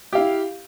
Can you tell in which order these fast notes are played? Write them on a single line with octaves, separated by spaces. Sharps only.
G4 F5 E4